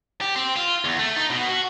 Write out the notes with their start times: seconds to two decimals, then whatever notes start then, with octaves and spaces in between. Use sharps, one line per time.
0.21 G4
0.36 C4
0.56 F4
0.85 E2
0.99 A3
1.16 D#4
1.30 B2
1.48 F#4